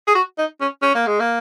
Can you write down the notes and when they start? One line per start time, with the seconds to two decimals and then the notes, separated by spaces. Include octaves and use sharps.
0.07 G#4
0.15 F#4
0.38 D#4
0.61 C#4
0.82 C#4
0.95 A#3
1.07 G#3
1.20 A#3